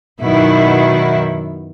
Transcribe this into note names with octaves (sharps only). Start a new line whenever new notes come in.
F#2 B2 D#3 E4